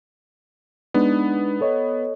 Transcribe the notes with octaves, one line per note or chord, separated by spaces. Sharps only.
G#3 B3 D4 D#4
A4 C#5 D#5